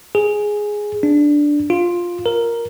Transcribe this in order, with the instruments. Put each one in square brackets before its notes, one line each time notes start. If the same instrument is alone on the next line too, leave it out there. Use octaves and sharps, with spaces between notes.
[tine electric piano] G#4
D4
F4
A#4